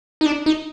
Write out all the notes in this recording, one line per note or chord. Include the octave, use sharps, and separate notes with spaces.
D#4
D4
D#4